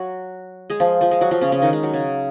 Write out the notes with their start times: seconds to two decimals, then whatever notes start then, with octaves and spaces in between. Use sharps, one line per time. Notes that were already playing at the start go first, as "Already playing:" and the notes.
Already playing: F#3 F#4
0.70 G#3 G#4
0.80 F3 F4
1.01 F3
1.11 G#3
1.21 F#3 F#4
1.31 F3 F4
1.41 C#3 C#4
1.52 C#3 C#4
1.62 D#3 D#4
1.73 G#3
1.83 F#3
1.94 C#3